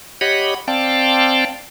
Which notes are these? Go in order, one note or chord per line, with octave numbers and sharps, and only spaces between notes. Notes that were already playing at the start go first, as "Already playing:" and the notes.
G4 C#5 D#5 F#5 B5
C4 D5 F5 G5 A5